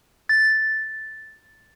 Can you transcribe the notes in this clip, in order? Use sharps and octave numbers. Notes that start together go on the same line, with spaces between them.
A6